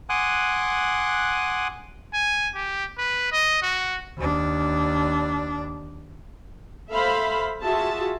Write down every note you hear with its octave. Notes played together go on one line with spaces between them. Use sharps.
F#5 G#5 C6 D6 D#6 F#6
G#5
G4
B4
D#5
F#4
D#2 D4
A4 C5 E5 F5 B5
F4 F#4 G#4 E5 A5